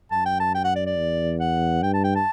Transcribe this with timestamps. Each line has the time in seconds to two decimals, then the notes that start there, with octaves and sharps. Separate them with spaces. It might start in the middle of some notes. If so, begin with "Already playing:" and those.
0.11 F#2 A5
0.26 G5
0.40 A5
0.55 G5
0.64 F#5
0.76 D5
0.86 D5
0.97 E2
1.40 F#5
1.83 G2 G5
1.94 A5
2.04 G5
2.16 A5